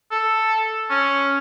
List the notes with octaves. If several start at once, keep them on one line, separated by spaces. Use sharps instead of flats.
A4
C#4